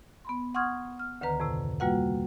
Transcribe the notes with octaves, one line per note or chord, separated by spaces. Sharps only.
B3 B5 C6
F#5 C6 C#6 D#6 F6 G#6
F6
D2 D3 D#3 B4 A#5
F2 A2 C3
G3 A#3 F4 F#4 B4 F#5